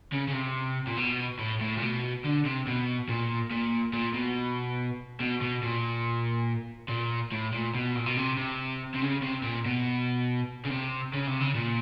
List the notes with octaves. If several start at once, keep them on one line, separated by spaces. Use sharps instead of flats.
C#3
C#3
C3
A#2
B2
A2
A2
A#2
B2
D3
C3
B2
A#2
A#2
A#2
B2
B2
B2
A#2
A#2
A2
A#2
B2
A#2
B2
C3
C3
C3
C#3
C3
A#2
B2
C#3
C3
C#3
C3
C#3
A#2